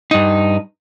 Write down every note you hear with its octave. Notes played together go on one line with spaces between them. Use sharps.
G2 D#4